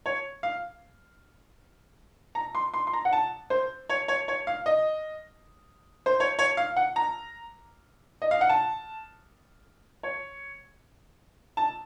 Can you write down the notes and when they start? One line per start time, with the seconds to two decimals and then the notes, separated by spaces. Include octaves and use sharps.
0.06 C#5
0.43 F5
2.35 A#5
2.55 C6
2.74 C6
2.87 C6
2.93 A#5
3.05 F#5
3.13 A5
3.50 C5
3.89 C#5
4.08 C#5
4.28 C#5
4.47 F5
4.66 D#5
6.06 C5
6.20 C#5
6.39 C#5
6.57 F5
6.76 F#5
6.96 A#5
8.22 D#5
8.31 F5
8.41 F#5
8.49 A5
10.03 C#5
11.57 A5